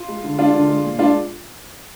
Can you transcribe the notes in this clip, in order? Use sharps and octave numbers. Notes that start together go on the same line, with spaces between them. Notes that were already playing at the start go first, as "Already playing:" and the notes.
Already playing: F4
G#3
D3
G#3 D4 F4
D3
G#3
A#2
G#3 D4 F4